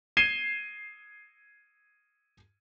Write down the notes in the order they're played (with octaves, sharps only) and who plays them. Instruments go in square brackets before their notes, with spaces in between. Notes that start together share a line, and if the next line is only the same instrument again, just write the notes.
[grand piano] G#6 C7 D#7 E7 G7